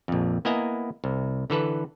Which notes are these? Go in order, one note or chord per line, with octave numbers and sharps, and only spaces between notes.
A#1 F2
A#3 B3 E4 D#5 G#5 A#5
C2
D3 E3 A4 B4